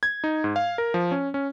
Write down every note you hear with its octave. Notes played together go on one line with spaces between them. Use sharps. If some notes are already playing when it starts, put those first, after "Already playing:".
G#6
D#4
G#2
F5
A#4
F3
C#4
C#4